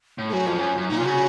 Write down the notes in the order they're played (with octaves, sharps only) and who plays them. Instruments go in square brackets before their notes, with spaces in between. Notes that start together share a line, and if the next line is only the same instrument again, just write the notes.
[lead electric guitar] A2
[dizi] A4
[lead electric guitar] F#2 [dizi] F#4
[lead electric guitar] F2 [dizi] F4
[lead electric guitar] F#2
F#2
[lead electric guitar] A#2 [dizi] D#4
[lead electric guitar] C3 [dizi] F4
[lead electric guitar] C#3 [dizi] F#4